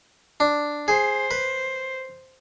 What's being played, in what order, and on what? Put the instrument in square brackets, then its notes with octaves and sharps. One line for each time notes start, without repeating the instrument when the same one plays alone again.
[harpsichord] D4
[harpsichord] G#4 [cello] C5
[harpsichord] B4